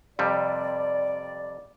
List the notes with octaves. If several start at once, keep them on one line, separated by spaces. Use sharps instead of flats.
F2 C3 G3 D5